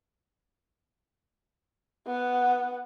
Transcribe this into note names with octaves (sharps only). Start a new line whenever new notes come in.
B3 F#5